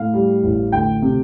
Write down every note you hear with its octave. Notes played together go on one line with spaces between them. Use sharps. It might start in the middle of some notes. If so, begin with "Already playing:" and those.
Already playing: A2 F5
G3
A1
D2 G5
C3